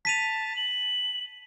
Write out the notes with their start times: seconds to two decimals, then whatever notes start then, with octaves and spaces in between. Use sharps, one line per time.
0.05 A5 B6 D#7 F7
0.56 F#7